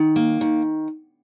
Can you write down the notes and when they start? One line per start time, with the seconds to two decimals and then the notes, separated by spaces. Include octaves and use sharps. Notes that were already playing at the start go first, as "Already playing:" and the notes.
Already playing: D#3
0.16 A#3
0.41 D#3